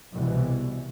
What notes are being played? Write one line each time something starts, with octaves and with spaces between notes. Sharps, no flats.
C2 B2 E3